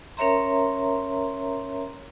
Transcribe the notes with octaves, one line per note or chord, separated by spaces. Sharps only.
C#4 A#4 C#5 E5 A#5 C6